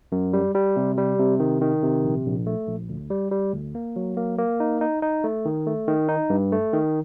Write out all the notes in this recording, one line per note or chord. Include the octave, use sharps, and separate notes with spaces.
F#2
G3
G3
C3
G3
C3
D#3
D#3
C3
A#1
A#1
A3
A#1
D2
G3
G3
D2
A#3
F#3
A#3
A#3
D#4
D#4
D#4
A3
D#3
A3
D#3
D#4
G2
A3
D#3